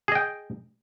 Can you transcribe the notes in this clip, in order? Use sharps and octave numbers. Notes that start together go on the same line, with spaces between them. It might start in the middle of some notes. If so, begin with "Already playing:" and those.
G#4 D#5 G5